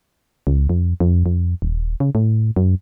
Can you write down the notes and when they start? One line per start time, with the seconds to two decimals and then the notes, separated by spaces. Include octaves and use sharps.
0.47 C#2
0.69 F2
1.00 F2
1.26 F2
1.62 D#1
2.00 C#3
2.15 A2
2.56 F#2